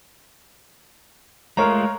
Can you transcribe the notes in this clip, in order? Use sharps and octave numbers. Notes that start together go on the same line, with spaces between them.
G#3 A3 F4 A#4 C#5 A#5